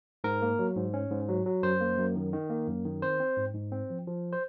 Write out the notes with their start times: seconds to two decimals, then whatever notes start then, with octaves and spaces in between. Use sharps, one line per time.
0.24 G#2 A#4
0.42 A#3
0.59 F#3
0.76 G#2
0.94 C#4
1.11 G#2
1.29 F#3
1.46 F#3
1.63 F#2 C5
1.80 A#3
1.98 F#2
2.16 D#3
2.33 D#3
2.50 A#3
2.68 F#2
2.85 D#3
3.02 C4 C5
3.20 C4
3.37 G#2
3.54 G#2
3.72 C4
3.90 F3
4.07 F3
4.33 C5